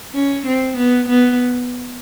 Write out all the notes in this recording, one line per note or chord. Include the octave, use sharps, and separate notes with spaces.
C#4
C4
B3
B3